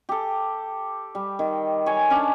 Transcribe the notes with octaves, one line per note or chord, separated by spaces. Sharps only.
G4 A4
G3
D#3
C#5 G#5
C#4 D4